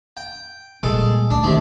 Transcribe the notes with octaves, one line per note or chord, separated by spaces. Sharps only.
G5
A#2 G3 G#3 A4
D2 D4
C3 D#3 G#3